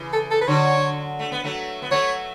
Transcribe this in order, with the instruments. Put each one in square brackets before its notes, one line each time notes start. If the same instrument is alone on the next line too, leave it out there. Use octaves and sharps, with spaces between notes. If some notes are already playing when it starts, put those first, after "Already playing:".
Already playing: [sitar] C#3 E3
[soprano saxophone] A4
A4
B4
[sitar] D3 F#3 [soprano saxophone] C#5
[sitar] A3
B3
F#3 A3
B3
[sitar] F#3 A3 [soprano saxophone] C#5